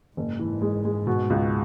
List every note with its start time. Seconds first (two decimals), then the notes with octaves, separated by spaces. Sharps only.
0.17 F#1 G#2
0.39 E3
0.62 G#3
0.85 G#3
1.07 B2
1.30 C#2